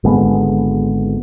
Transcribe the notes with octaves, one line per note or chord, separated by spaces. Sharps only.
G#1 D3 G#3 B3